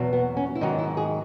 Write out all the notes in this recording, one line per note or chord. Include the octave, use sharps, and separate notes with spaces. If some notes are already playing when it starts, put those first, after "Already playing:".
Already playing: E2 B2 F#3
B3
C#4
E4
G#2 D#3 F#3 D#4
E4
G#4